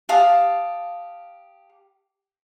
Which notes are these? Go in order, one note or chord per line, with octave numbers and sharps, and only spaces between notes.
G4 F5 A5 D#6